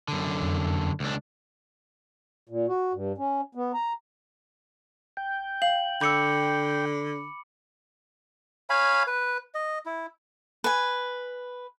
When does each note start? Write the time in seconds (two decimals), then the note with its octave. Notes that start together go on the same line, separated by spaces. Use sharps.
0.08 F#2 D3
0.42 F2
1.00 C#2 D4
2.49 A#2
2.69 F#4
2.93 G2
3.18 C#4
3.55 B3
3.74 A#5
5.17 G5
5.62 F5 F#7
6.01 D3 B5 D6 E6 G6 C#7
8.70 C#5 F5 G#5 B5
9.07 B4
9.55 D#5
9.86 E4
10.64 B4 G#5